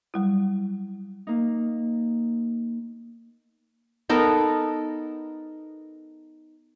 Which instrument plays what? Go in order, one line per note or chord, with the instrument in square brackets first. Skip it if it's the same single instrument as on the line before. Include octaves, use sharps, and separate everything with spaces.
[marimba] F#3 G3 E4
[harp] A#3 D#4
[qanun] B3 D#4 A4 A#4